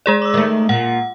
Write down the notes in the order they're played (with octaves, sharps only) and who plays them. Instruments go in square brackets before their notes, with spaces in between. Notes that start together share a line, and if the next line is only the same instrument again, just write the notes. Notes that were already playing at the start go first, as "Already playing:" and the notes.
[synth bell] G#3 G#4 D5
D6 E6
[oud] D#3 A3
[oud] A#2 [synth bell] F#5